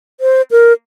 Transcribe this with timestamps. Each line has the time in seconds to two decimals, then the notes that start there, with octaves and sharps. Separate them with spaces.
0.20 C5
0.51 A#4